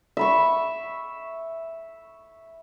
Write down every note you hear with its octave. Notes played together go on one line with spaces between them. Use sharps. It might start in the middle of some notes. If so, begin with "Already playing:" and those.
E5 B5 C#6